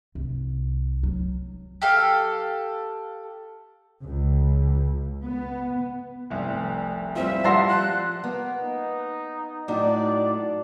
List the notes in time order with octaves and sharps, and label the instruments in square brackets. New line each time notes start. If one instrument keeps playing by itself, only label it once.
[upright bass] C2
F#3
[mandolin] G4 A4 F5
[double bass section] C#2
B3
[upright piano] F1 C2
[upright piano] G3 C4 F4 [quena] E5
[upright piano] F3 F5 A#6 [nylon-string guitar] G3 F#5 [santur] A5 C6
[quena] F#6
[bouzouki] A#3 [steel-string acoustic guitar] B3
[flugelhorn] D#4
[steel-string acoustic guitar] A2 F#3 D#4 [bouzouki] D4 [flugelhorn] D5